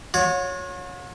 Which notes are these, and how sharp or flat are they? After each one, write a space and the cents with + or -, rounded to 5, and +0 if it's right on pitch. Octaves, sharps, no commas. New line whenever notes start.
F#4 -45 C#5 +0